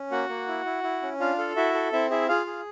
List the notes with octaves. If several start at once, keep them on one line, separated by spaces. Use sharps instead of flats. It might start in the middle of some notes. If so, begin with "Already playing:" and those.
Already playing: C#4
A#3 F#4 F#5
A#3
E4
E4
E4
C#4
D4 F4 F5
A4
E4 F#4 E5
A4
C4 E4 E5
E4 G#4 E5
F4 G#4 F5
G#4